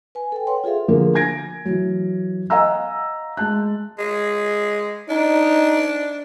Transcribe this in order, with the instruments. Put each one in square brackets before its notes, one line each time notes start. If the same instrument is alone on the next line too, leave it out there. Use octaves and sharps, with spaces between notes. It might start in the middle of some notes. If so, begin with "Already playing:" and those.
[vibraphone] B4 G#5
A4 G5
B4 C#5 F#5 C6
F4 G#4 A4 E5 F5
[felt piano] D3 F3 A#3 G#4 A#4
G#5 G#6 A#6 D7
E3 F#3
D#5 F5 F#5 G#5 A#5 E6
G#3 A5 F#6
[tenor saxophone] G#3
[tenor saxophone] D4 [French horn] D#4